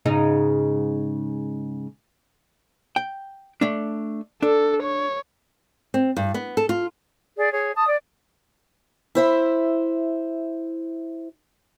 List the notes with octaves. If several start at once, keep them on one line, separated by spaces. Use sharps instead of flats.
G#2 C#3 D#4
G5
A3 D4
D4 A4
C#5
C4
G2
B3
A4
F4
G#4 D5
G#4 C#5
A5 D#6
D5
E4 C5 E5